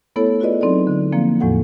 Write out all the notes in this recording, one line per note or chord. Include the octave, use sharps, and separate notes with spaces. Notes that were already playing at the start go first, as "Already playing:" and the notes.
A3 B3 E4 A4 C#5
F4 F#4 G#4 B4 D5 D#5
F#3 C4 D#4 A4 D5
D3
F3 A#3 C4
E2 A2 F3 F#4 A4 F#5